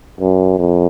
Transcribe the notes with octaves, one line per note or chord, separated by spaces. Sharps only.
F#2
F2